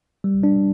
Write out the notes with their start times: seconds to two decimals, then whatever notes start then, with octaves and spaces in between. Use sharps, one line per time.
0.24 G3
0.43 D4